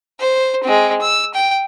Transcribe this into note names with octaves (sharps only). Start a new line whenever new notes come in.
C5
G#3 C4
E6
G5